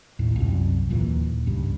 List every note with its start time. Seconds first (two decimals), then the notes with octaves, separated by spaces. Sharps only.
0.19 D#2 A2 D#3
0.36 C2 F#2
0.90 D1 D#2 A#2 E3
1.46 C#2 G2